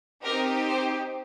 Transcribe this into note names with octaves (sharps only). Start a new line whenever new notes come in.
C4 D#4 G4 A#4
C5